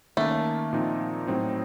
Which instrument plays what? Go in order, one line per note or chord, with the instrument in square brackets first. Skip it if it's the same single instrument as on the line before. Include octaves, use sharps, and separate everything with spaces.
[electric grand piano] D#3 A#3 C#4 [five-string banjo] A3
[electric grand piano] A#2 F3 C4 D#4
A2 F#3 C4 D#4